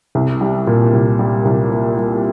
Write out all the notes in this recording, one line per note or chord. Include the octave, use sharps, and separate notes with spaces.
C2
G3
A#2
C2
G3
C2
A#3
G3